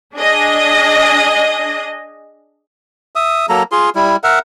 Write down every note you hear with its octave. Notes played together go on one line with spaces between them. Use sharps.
D4 G#4 D#5
E5 D#6
F#3 A#3 A4 A#5
F4 G#4 C6
G3 E4
A#4 E5 F#5